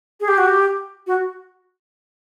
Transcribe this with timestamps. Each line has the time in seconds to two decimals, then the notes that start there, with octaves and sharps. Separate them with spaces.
0.20 G#4
0.28 G4
0.38 F#4
0.46 G4
1.07 F#4